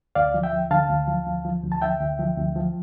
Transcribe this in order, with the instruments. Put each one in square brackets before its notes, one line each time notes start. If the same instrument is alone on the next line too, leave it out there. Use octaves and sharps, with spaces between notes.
[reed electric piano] D2 D5 F5
F3
E5 G5
D2
D3 F5 A5
D2
F3
D2
F3
D2
A5
D3 E5 G5
D2
F3
D2
F3